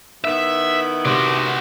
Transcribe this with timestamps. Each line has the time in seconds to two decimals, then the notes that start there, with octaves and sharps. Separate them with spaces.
0.24 D#3 B3 E4 E5
1.05 C3 F#4 D5 C6